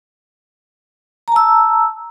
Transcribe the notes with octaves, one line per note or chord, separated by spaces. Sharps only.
A5 A#5 E6